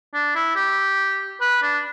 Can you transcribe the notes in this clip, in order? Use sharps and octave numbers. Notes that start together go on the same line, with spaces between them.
D4
E4
G4
B4
D4